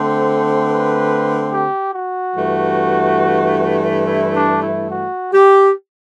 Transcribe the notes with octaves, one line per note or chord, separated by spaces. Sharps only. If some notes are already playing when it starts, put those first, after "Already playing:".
Already playing: D3 A3 C4 C5
B4
G4
F#4
G2 E3 A3
E4
D4
E4
F#4
G4